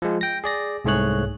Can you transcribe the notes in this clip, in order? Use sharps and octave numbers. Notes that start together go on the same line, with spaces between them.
F3 G#3
G5 A#6
G#4 D5 A#6
C2 G#2 A3 G#4 C#5 F#6